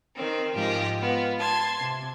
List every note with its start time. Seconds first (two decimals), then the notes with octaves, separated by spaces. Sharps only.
0.17 D#3 C4
0.54 G#2 F3 G4 D#5
0.99 B3 F4
1.39 A5 C6 G#6
1.80 C3